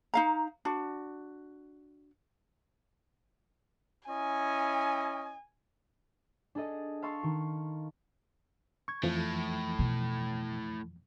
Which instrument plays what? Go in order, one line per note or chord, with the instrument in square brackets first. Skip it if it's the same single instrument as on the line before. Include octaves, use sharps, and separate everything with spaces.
[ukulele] D#4 F5 A#5
D4 F#4
[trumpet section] C#4 E4 D#5 [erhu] G#5
[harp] D4 G#4 A4 D#5
F5 A5 C6 C#6 E6
D#3
[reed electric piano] C#6 G#6
[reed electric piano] F2 E3 F3 [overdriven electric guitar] A2
[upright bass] B2